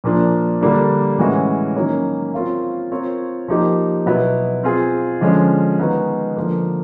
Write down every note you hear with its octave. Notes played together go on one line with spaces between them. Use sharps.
A#2 F3 A#3 D4
D3 G3 A#3 D4
A2 E3 G#3 C#4 F#4
D#3 F#3 A#3 C#4
C4 F4 A#4 C#5 F5
C4 F4 A#4 C#5
F3 A#3 D#4 G4
B2 F#3 B3 E4
C4 F4 G#4
D3 F3 G#3 C#4
D#3 G#3 B3 D#4 F#4
D3 F3 A#3